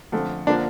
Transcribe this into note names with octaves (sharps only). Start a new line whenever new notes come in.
F2 D3 A3
D3 F3 A#3 D4